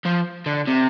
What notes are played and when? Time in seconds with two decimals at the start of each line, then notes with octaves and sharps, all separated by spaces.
0.05 F3
0.46 D3
0.67 C3